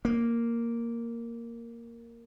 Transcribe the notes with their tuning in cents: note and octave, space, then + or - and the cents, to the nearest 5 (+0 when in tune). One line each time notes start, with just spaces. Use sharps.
A#3 -5